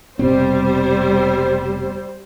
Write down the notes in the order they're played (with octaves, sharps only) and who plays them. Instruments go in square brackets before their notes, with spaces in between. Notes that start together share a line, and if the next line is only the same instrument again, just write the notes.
[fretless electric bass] F1 B2 C4 [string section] G3 C5